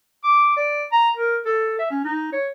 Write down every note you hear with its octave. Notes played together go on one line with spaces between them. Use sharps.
D6
D5
A#5
A#4
A4
E5
C#4
D#4
C#5